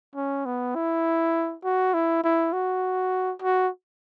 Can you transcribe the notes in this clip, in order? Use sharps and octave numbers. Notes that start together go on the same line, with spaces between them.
C#4
B3
E4
F#4
E4
E4
F#4
F#4